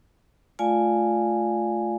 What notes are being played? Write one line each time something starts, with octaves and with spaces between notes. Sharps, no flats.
A3 F4 D5 F5 G#5